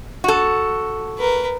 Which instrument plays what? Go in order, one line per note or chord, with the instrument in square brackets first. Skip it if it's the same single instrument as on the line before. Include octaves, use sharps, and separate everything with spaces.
[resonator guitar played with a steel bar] F#4 A4
[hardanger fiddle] A#4 B4